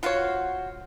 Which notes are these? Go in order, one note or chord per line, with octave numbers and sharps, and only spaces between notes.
F4 F#4 C5 C#5 F5